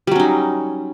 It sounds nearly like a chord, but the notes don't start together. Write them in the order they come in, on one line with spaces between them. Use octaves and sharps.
G3 F#3 C#4 D#4